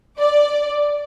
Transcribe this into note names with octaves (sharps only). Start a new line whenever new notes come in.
D5